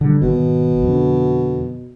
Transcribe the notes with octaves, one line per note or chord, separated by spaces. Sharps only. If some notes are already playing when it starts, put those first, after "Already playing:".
D3 G3
G#1 B2
F2 D3